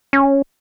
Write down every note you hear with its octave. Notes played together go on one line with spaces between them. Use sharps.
C#4